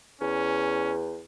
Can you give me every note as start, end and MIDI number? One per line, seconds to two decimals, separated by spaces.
0.21 1.23 40
0.21 0.94 61